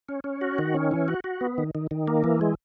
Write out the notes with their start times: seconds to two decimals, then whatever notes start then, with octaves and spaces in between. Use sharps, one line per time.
0.09 C#4
0.24 C#4
0.41 F#4
0.58 D#3
0.74 C#4
0.91 E3
1.08 F#4
1.24 F#4
1.41 B3
1.58 D#3
1.75 D#3
1.91 D#3
2.08 A#3
2.24 E3
2.41 G#3